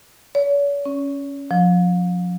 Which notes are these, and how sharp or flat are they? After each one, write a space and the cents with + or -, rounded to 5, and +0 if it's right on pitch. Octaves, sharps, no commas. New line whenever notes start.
C#5 +40
C#4 +5
F3 +35